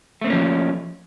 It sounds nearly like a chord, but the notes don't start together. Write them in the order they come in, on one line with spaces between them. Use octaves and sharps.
A3 C4 A#3 C#4 F3